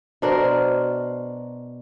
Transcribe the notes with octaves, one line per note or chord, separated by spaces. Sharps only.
B2 D4 A#4 C5